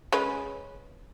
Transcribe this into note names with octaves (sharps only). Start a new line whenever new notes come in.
G#3 C#4 B4